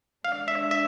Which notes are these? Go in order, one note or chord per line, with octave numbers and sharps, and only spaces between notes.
G#3 D4 A4 F5
E5
E5